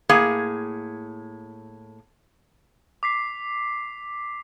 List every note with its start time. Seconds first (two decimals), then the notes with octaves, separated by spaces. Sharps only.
0.09 A2 A#3 G#4
3.03 D6 B6 C7